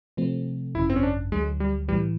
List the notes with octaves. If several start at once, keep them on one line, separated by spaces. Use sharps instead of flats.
C3 F3 A3 C4
G#1 F#2 C#3 E4
C4
C#4
D4
D2 D3 F#3 G#3
G3
B1 A2 E3 G3